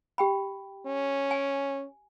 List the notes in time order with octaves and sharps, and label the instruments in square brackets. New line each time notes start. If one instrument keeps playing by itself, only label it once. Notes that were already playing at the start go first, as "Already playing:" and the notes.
[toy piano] G4 G5 B5
[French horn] C#4
[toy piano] G#5